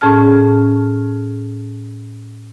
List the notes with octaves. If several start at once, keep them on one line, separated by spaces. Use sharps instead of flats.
A2 C#4 G#4 A5 F6